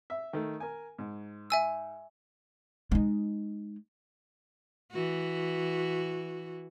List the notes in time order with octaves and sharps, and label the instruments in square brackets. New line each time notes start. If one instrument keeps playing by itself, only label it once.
[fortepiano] E5
D#3 A3
A#4 G#5
G#2
[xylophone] E5 G#5 E6
[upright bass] G#3 D#4
[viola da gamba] E3 F#4